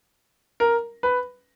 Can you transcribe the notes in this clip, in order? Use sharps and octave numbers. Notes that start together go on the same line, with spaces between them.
A#4
B4